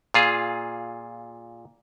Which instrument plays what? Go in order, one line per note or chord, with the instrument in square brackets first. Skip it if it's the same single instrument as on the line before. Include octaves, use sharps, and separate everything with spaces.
[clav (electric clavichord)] A#2 F4 G#4